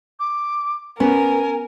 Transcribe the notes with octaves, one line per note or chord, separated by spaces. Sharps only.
D6
B3 C#4 A#4 G#5